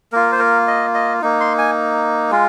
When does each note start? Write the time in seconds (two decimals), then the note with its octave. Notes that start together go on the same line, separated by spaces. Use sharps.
0.12 A#3 F4 A#4
0.32 C5
0.39 A#4
0.67 D#5
0.94 D#5
1.22 A#3 D#4
1.40 C6
1.58 G#5
2.31 G#3 F4